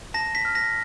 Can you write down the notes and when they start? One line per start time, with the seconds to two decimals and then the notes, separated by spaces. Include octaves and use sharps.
0.14 A5 A#6
0.35 B6
0.45 F6
0.55 A#6